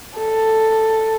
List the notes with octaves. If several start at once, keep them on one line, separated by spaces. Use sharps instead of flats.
A4